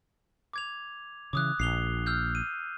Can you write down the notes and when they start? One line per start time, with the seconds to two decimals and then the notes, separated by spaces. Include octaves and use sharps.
0.53 D6 G#6 F7
1.33 C#3 E3 D6 D#6 F#6
1.60 A#1 C7 F7 G7
2.06 E6 F6 G6
2.35 D#7